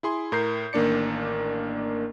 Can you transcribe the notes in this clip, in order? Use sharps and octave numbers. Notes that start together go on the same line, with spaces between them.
E4 G#4 C6
A2 A#4 G6 C7
A1 D#3 A#3 D4 D5 C#7